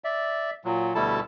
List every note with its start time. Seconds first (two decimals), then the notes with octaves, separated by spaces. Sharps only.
0.04 D5 E5
0.65 A#2 F#3
0.95 D2 B2 G3 E4 A4 A5